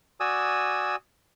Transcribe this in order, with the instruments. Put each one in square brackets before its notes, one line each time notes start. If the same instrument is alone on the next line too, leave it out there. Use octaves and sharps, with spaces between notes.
[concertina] F#4 D5 G#5 D#6 E6